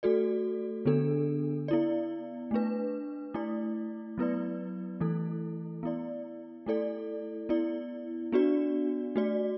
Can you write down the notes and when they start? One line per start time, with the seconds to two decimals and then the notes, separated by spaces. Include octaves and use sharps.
0.03 A3 F#4 A4 D5
0.86 D3 B3 D4 A4
1.68 B3 E4 D5
2.51 A3 D4 B4
3.34 A3 E4 D5
4.18 F#3 B3 E4 B4 D5
5.00 E3 A3 E4 A4
5.83 B3 E4 D5
6.66 A3 E4 A4 D5
7.49 B3 E4 D5
8.32 B3 D4 F#4 D5
9.16 A3 F#4 D5